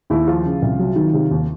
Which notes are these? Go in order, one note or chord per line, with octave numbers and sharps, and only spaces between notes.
D#2 E4
F3 F4
C#3
C2
F#3
D#3
C3
D#2